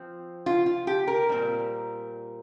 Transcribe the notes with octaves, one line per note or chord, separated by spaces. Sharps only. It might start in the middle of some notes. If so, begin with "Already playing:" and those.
Already playing: F3 C4
F4
F4
G4
A#4
A#2 G3 C4